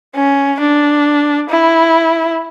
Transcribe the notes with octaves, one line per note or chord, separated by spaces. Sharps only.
C#4
D4
E4